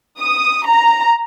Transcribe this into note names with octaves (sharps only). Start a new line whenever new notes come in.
D#6
A#5